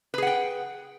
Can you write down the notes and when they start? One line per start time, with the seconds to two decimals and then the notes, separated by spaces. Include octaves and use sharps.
0.14 B4
0.18 G#4
0.22 F#5
0.27 G5